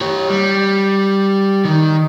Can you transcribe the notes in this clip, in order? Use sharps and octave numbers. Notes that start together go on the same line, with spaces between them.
G4 C#5
G3
D#3